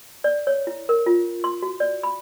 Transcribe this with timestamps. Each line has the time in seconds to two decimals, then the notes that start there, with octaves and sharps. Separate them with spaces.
0.24 D5
0.47 C#5
0.67 E4
0.89 A#4
1.06 F4
1.44 C6
1.62 F#4
1.80 D5
2.03 B5